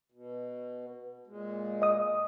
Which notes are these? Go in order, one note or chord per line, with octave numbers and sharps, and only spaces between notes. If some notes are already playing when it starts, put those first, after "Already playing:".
B2
A#2 G#3
D#5 D#6